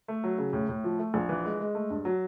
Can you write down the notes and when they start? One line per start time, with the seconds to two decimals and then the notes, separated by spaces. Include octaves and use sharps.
0.08 A3
0.24 F#3
0.38 C#3
0.53 A2
0.69 A2
0.84 F3
0.99 A3
1.14 A#1
1.29 E3
1.45 G#3
1.60 G#3
1.75 A3
1.90 G2
2.05 F#3